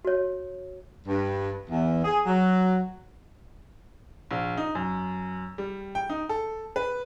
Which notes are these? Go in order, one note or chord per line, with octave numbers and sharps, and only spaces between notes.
F#4 C#5
G2
E2
G#4
F#3
A#1
D#4
F#2
G3
G5
D#4
A4
B4